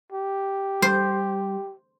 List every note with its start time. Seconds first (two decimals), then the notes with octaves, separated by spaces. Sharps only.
0.12 G4
0.82 G3 C5